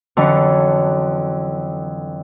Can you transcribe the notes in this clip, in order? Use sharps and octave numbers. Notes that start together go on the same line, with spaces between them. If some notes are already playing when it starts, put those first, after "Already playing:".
F2 D3 E3 F#3 C#4